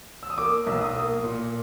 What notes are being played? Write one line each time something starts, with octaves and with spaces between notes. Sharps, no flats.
E6
D#6
A#3 D6
B1 E6
D#6
A#3
A#2